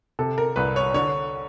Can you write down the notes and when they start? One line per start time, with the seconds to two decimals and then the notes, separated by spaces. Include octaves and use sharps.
0.19 C3 A4
0.38 A#4
0.56 C2 B4
0.76 C#5
0.94 D3 C#5